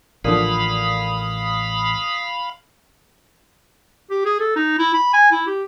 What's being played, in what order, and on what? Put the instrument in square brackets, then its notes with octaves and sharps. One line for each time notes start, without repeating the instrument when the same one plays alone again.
[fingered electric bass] A1 [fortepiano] A#2 D3 F3 [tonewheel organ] F5 B5 [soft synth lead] D#6
[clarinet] G4
G#4
A4
D#4
E4
B5
G#5
E4
G4